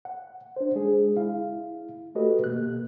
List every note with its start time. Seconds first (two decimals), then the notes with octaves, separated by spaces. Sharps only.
0.05 F#5
0.56 D4 C5
0.75 G#3 D4 G#4
1.17 E4 F5
2.15 A3 F#4 G4 A4 B4 D#5
2.44 B2 A#3 F#6